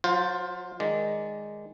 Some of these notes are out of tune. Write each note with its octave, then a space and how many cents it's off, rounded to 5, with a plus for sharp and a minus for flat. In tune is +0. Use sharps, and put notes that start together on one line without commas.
F#3 -30 F4 +20 C5 +0
D#3 +0 G#3 +0 D5 +0